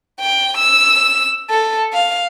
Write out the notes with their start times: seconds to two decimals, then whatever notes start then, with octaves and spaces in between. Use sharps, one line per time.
0.20 G5
0.57 E6
1.50 A4
1.93 F5